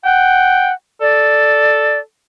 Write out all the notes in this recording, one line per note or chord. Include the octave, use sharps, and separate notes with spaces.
F#5 G5
A4 D5